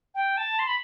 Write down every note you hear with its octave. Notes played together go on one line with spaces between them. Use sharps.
G5
A5
C6
B5